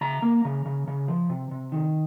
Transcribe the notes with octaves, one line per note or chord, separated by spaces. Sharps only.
C#3 A#5
A#3
C#3
C#3
C#3
F3
C3
C3
D#3